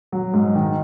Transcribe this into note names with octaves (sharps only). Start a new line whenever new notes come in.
F#3
G#2
D#3